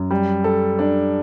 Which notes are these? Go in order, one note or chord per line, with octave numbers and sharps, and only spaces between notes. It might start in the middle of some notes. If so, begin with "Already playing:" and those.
Already playing: F#2
G3
A4
D4